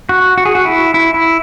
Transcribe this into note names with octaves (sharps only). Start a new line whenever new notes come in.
F#4
F#4
G#4
F#4
E4
E4
E4